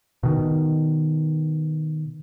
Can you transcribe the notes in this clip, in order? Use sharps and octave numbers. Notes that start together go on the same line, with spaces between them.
B2 D#3